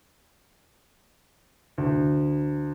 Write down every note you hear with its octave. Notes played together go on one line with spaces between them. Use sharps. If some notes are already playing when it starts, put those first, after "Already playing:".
D2